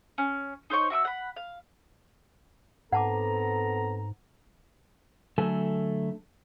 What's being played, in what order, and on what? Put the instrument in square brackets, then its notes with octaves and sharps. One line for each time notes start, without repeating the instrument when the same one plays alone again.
[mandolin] C#4
D#4 C5 C#5 C#6
F#4 E5 D6 E6
F#5 B5
F5
[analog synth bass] G#2 [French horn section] B3 C4 A4 [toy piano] F#5 A5 D6 [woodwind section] A#5
[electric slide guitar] D3 F#3 A3 A4 G#5